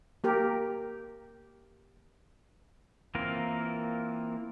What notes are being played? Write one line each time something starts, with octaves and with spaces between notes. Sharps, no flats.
A#3 G4 A#4
E3 A#3 C4 F4 A#4